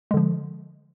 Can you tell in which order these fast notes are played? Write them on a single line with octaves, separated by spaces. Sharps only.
G#3 D3 F3